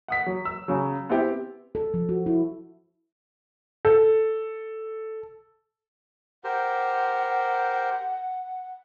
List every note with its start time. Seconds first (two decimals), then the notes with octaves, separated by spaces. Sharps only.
0.08 F#5 D#6 B6
0.26 F#3
0.45 E6
0.68 C#3 F#3
1.09 B3 C4 E4 G4
1.75 A4
1.94 F3
2.09 F#4
2.26 E4
3.85 A4
6.44 G4 A#4 C5 F#5